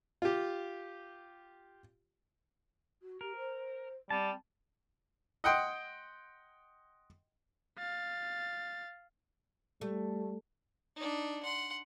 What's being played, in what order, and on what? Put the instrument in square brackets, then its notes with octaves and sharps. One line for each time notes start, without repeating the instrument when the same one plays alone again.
[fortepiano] F4 G4
[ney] F#4
[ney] G4 [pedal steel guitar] A#4
[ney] C5
[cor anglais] G3 [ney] C4 [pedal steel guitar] A5
[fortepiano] D#5 F#5 G5 C6
[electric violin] F5 A6
[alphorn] G3 [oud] A3
[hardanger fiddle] D4 D#4
F#5 C6